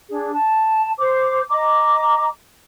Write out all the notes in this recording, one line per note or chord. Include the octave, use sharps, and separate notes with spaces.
D4 G#4
A5
C5 D6
D#5 A#5 D6